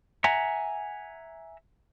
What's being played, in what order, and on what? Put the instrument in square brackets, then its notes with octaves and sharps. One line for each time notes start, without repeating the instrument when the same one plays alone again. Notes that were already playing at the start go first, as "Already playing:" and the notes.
[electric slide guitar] E5 F#5 G#5 A#5